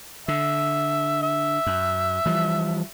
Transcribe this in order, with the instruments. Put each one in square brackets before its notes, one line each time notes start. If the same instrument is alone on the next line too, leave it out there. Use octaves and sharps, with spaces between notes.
[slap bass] D3 [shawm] E5
[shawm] E5
[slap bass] F#2
E3 F3 G3